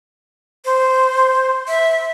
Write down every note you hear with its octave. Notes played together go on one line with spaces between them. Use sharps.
C5
E5